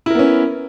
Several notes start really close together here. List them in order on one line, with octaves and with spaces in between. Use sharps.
E4 A#4 B3 C#4